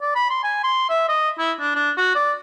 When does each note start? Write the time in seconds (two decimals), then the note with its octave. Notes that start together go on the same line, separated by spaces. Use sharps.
0.02 D5
0.15 B5
0.30 C6
0.43 G#5
0.64 C6
0.89 E5
1.08 D#5
1.39 E4
1.60 D4
1.75 D4
1.97 F#4
2.15 D5